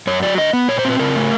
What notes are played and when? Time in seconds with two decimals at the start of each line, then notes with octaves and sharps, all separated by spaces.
0.07 F#2 C#5
0.23 F#3 D5
0.38 D3 D#5
0.53 B3
0.68 A#2 C#5
0.79 C5
0.85 C4
0.90 B4
0.99 C#3 A#4
1.16 A3